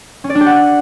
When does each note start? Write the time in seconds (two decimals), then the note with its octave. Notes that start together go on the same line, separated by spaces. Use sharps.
0.24 C#4
0.30 D5
0.35 D4
0.41 G4
0.46 F#5